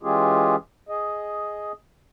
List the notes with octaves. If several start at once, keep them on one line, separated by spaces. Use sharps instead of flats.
E3 G#3 C#4 F4 G4 G#4
G#4 D#5